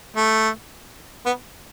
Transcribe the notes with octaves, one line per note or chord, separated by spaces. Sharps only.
A3
B3